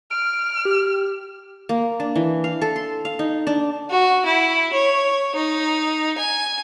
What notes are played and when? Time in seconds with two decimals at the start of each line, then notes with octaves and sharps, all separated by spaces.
0.11 F6 D7
0.65 G4
1.69 A#3
2.00 D4
2.15 E3
2.44 F5
2.62 A4
2.76 C6
3.05 F5
3.19 D#4
3.47 D4
3.90 F#4
4.26 E4
4.73 C#5
5.35 D#4
6.18 G#5